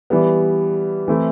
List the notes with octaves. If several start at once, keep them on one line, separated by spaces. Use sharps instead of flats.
E3 G3 B3
E3 A3 C4 E4